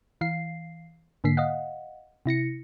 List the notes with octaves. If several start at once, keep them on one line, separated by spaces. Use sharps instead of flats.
E3 F5 C7
G#2 D3 A#3 B6 C7
D#5 F5 F#5
C3 E4 A#6 C#7